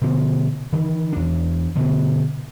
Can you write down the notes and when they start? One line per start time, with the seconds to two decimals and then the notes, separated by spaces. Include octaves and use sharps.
0.02 B2 D3 F3
0.73 D#3 E3
1.13 E2 D4
1.76 G2 B2 D3